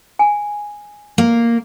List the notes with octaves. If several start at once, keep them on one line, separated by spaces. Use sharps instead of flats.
G#5
A#3